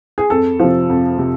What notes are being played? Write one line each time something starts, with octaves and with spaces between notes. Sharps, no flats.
G#4
F2 A4
C3 F3
F2
C3